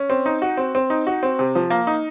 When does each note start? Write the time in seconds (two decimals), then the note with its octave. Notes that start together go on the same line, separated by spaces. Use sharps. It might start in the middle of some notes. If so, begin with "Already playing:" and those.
Already playing: C#4
0.10 C4
0.26 D#4
0.42 F#4
0.57 C4
0.75 C4
0.90 D#4
1.07 F#4
1.23 C4
1.39 C3
1.55 F3
1.70 A#3
1.87 D#4